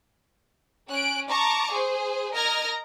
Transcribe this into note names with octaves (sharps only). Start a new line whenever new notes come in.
C#4 F#6 D7
A5 A#5 C#6 D6
G#4 C5
A#4 D#5 A#5 F6 G#6 A#6